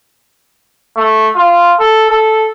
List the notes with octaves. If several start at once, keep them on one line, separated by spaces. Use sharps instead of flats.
A3
F4
A4
A4